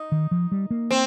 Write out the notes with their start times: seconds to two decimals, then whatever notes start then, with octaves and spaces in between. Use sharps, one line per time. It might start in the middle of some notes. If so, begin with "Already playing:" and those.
Already playing: D#4
0.12 D#3
0.31 F3
0.51 G3
0.70 A#3
0.91 C4